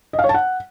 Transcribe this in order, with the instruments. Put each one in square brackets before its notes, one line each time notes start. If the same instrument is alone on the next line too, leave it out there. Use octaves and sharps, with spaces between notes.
[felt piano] D#5
F5
C#5
A5
F#5